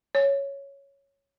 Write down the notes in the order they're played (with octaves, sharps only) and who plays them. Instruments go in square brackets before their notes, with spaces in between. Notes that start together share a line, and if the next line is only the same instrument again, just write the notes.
[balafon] C#5